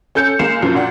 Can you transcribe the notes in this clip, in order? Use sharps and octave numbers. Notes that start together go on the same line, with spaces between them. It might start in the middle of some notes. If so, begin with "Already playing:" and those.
C#4 A4 G6 C#7
G#3 A#3 F5 C7 E7
B1 F#2 F3
A#2 D4 F#5